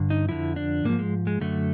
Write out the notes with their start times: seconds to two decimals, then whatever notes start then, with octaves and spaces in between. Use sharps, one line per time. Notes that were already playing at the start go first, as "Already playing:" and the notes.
Already playing: G2 D3
0.10 D#4
0.29 F2 D3 F3 E4
0.56 D4
0.84 G#2 F3 A#3
0.99 G#3
1.27 G#3
1.41 F#2 D3 F#3 A3